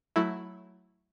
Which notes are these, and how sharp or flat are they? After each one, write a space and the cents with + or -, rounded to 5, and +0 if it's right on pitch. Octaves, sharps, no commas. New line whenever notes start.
F#3 +0 A3 +0 E4 +0